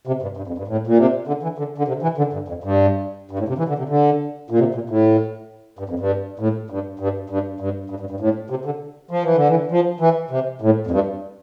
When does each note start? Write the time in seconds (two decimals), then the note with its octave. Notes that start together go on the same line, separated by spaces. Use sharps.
0.07 C3
0.22 G2
0.37 G2
0.47 F2
0.58 G2
0.68 A2
0.87 A#2
0.97 C3
1.27 D3
1.43 E3
1.58 D3
1.78 D3
1.88 C3
2.02 E3
2.18 D3
2.33 G2
2.48 F2
2.64 G2
3.31 G2
3.39 A2
3.48 C3
3.58 E3
3.68 D3
3.78 C3
3.89 D3
4.50 A#2
4.59 C3
4.75 A#2
4.90 A2
5.79 G2
5.89 F2
6.00 G2
6.39 A2
6.70 G2
6.99 G2
7.30 G2
7.60 G2
7.90 G2
8.00 G2
8.10 G2
8.20 A2
8.50 C3
8.65 D3
9.11 F3
9.24 E3
9.35 D3
9.49 E3
9.71 F3
10.00 E3
10.30 C3
10.61 A2
10.87 F2
10.91 G2